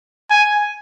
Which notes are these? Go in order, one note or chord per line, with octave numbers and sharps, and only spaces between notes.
G#5